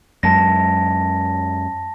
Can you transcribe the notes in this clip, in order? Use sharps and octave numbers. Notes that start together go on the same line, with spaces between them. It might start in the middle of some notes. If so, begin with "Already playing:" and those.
F#2 G#3 A5 A#6